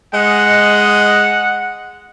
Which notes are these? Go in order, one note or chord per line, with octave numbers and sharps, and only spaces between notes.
G#3 D#5 F#5